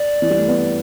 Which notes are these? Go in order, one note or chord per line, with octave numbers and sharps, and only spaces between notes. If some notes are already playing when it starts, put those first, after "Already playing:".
Already playing: D5
E3
G3
A3
B3